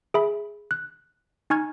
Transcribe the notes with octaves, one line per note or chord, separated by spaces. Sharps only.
G#4 E5 B5
F#6
D#4 G#5 C#6 F6 G#6